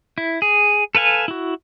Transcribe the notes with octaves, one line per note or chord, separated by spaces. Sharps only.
E4
G#4
A4 B4 F5 G#5
E4 F#4